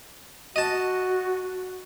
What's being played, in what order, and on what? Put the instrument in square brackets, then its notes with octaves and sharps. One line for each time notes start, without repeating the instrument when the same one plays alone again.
[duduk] F#4 [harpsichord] D#5 A5